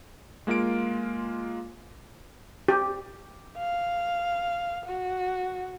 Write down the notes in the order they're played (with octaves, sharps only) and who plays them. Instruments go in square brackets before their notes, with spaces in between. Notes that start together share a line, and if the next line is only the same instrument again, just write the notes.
[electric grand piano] G#3 A#3 F4 F5 D7
[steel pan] G4
[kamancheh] F5
F#4